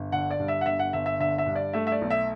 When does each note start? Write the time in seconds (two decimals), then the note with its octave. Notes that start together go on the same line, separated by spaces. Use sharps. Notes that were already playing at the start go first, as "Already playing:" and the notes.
Already playing: G1
0.12 D3 F#5
0.31 D5
0.39 G2
0.48 E5
0.61 F#5
0.66 G1 E5
0.79 F#5
0.93 G1 E5
1.06 E5
1.19 D3 E5
1.38 E5
1.46 G2
1.55 D5
1.73 A3 E5
1.87 E5
1.92 D5
2.02 B1
2.11 E5